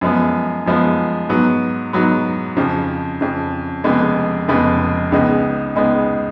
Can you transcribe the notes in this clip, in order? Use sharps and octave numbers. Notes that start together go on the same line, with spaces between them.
F#2 F3 G#3 B3
F#2 F3 G#3 B3
G#2 F#3 B3
G#2 F#3 B3
F2 C#3 F3
F2 C#3 F3
F1 F2 C#3 G#3 B3
F1 F2 C#3 G#3 B3
C#2 C#3 G#3 B3 D#4
C#2 C#3 G#3 B3 D#4